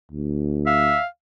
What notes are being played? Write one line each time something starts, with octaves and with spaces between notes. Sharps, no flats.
D2
E5 F5